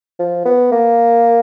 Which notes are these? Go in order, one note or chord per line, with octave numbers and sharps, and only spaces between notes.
F3
B3
A#3